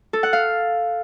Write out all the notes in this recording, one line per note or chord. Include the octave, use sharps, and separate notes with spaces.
A4
F#5
F5